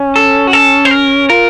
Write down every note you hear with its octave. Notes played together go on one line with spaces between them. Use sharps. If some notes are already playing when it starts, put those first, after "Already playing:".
Already playing: C#4
A4
F#4
A4
C5
A#4
F4 A#4